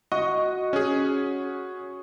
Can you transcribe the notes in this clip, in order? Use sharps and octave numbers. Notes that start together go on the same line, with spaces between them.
F#4 D#5
C#4 G#4